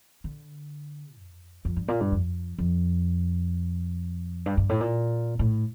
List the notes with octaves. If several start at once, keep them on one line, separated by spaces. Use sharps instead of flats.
D3
F2
F2
G2
A#2
G2
F2
F2
G2
G2
A2
A#2
A2